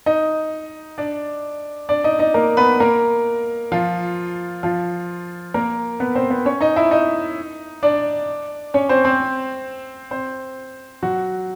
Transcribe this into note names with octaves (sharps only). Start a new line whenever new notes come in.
D#4 D#5
D4 D5
D4 D5
D#4 D#5
D#4 D#5
A#3 A#4
B3 B4
A#3 A#4
F3 F4
F3 F4
A#3 A#4
B3 B4
C4 C5
B3 B4
C#4 C#5
D#4 D#5
E4 E5
D#4 D#5
D4 D5
C#4 C#5
C4 C5
C4 C5
C4 C5
F#3 F#4